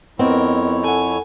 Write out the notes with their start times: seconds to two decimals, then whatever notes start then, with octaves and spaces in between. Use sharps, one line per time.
0.19 F2 B3 C4 E4 A#4 C#5 D#5
0.84 A4 F#5 G#5